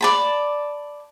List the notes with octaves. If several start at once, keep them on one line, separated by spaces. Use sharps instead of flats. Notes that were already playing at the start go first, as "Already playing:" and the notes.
D5 A5 B5